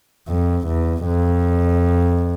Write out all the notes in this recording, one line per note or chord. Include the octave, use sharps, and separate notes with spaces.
F2
E2
F2